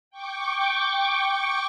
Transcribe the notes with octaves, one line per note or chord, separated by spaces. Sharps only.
G5 C#6 D6